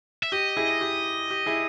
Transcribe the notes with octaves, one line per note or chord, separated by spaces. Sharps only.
E5
G4 D#5
E4 G#4
G4
G4
E4 G#4